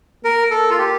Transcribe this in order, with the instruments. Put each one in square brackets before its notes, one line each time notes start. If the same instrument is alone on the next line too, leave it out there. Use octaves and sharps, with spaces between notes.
[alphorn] A#3 [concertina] A#4
[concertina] A4
F4
G4